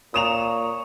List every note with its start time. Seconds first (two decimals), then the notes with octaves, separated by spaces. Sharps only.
0.14 A#2 C#5 A#5 D#6 E7 F7